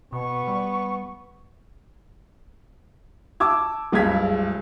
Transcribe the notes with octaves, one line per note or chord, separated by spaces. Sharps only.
B2 B3 C#6
G3
A5 D6 E6 G#6
F#1 C#2 G2 F5 G#6 B6